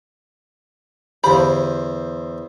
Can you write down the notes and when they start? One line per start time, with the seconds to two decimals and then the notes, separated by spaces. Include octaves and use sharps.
1.24 E2 D3 G4 C5 F5 B5